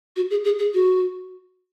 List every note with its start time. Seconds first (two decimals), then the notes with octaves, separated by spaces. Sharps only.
0.16 F#4
0.30 G#4
0.44 G#4
0.59 G#4
0.74 F#4